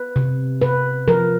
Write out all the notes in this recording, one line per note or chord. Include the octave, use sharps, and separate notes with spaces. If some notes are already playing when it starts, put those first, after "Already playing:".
Already playing: B4
C3
C3 B4
F3 A#4